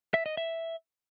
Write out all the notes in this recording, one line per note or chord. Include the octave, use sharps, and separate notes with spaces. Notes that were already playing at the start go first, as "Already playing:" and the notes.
E5
D#5
E5